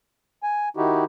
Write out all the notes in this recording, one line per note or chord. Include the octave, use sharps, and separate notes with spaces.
G#5
D#3 D#4 E4 F#4 G4